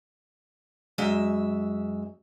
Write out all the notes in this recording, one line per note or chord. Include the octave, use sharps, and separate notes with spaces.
F#2 G#3 E5